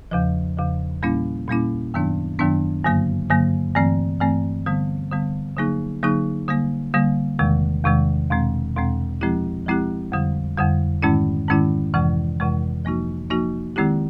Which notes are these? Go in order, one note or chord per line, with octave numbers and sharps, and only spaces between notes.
E2 C#3 F3
E2 C#3 F3
A#2 G3 A#3 C#4 E4
A#2 G3 A#3 C#4 E4
F#2 D#3 F#3 B3 D4
F#2 D#3 F#3 B3 D4
G2 D3 F#3 A#3
G2 D3 F#3 A#3
G2 E3 A3 C4
G2 E3 A3 C4
D3 G3 B3
D3 G3 B3
D3 F#3 A#3 D#4 G#4
D3 F#3 A#3 D#4 G#4
D3 G3 A#3
D3 G3 A#3
E2 C3 D#3 G#3
E2 C3 D#3 G#3
E2 B2 G#3 C4
E2 B2 G#3 C4
F3 G#3 C4 E4 G4
F3 G#3 C4 E4 G4
F2 D3 G3
F2 D3 G3
G#2 D#3 G#3 C#4 E4
G#2 D#3 G#3 C#4 E4
F2 C3 E3 G#3
F2 C3 E3 G#3
F3 A#3 D#4 F#4
F3 A#3 D#4 F#4
D#3 G#3 C4 E4 G4